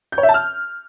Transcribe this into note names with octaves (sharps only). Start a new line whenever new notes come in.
G6
C#5
E5
A5
F6